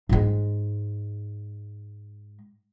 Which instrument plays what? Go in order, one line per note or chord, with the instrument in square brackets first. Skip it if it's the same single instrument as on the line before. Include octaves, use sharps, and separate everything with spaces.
[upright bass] G#2 G#3